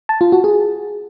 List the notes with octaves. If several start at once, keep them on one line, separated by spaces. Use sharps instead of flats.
A5
F4
F#4
G#4